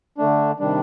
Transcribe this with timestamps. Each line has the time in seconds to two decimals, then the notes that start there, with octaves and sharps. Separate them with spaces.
0.18 D3 A3 D4
0.60 C3 D#3 G3 D4